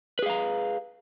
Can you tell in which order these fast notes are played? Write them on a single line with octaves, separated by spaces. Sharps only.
B4 G#4 F5 A#5